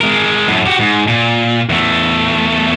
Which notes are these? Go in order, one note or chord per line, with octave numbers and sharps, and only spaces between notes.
G#3 A#4
F#2 A2
F#4 G4
G#2
A#2
E2 A3